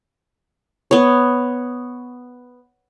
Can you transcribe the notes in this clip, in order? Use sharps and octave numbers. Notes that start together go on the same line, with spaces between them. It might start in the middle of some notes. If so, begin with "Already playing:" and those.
B3 C#5